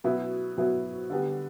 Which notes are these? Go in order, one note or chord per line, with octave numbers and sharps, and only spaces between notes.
B2 F#3 B3 E4
B2 F#3 B3 E4
D3 G3 B3